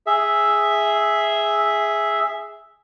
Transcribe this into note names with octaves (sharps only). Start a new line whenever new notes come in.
G#4 E5